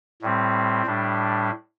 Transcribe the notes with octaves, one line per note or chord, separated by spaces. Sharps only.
A2 G3 C4
A2 G3 D4